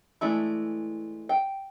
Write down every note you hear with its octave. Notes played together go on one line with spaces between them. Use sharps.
E3 G#3 A3 D4 E4
G5